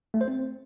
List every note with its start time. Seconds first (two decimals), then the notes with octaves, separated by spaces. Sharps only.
0.14 A3
0.21 C5
0.28 C4